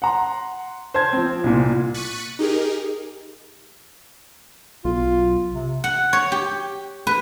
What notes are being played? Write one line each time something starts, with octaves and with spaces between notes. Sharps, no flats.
F#5 A#5 C6
C5 A5 G#6
F3 C4
C2 A#2
C#6 F#6 A6 B6 C#7 D#7
D#4 G4 G#4 A#4
B1 F4
C3
F#5
C#5
G4
B4